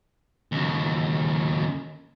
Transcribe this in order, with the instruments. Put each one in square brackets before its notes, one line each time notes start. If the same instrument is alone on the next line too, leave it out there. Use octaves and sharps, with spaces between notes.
[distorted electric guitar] D#2 C#3